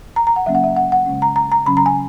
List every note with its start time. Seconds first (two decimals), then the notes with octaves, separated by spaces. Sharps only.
0.16 A#5
0.27 A#5
0.36 F#5
0.46 C#3 F#3 A#3 C#4 E5
0.55 F#5
0.64 E5
0.77 F#5
0.92 F#5
1.06 C#3 G#3 C#4
1.22 A#5
1.36 A#5
1.52 A#5
1.66 C#3 F#3 C#4 B5
1.77 A#5
1.86 G#5